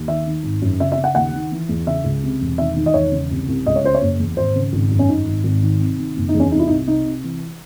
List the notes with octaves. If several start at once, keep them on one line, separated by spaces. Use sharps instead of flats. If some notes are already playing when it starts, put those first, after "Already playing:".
Already playing: D#2
D#3 E5
D#3
G#1
F#2
C#3 E5
E5
C#3
F#5
D#2 F#5
D#3
E3
E2
C#3 E5
C#2
C3
E1
D#3 E5
D#3
D#5
E1 C#5
C#3
C2
C2
C#2 D#5
C#5
C#3 C5
C#5
F#1
E2
G#1 C5
C#3
G#1
F#2
C#4
G#1 D#4
G#1
G#1
D#3
C3
D#3
F#1
D#4
E2
C#4
C3 D#4
E4
C2 D#4
C3 D#4
C3
E3